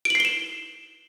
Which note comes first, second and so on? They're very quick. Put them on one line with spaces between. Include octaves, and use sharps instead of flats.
D7 F#7 C7 G7 E7